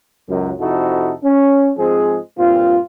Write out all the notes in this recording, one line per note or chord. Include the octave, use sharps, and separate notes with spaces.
C#2 F#2 F#3
F2 C3 D#4 E4 F#4 A4
C#4
G#2 F3 G#3 C4 G#4
G2 A#2 C4 F4